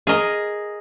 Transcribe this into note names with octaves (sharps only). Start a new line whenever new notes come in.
G#4 A#4 D#5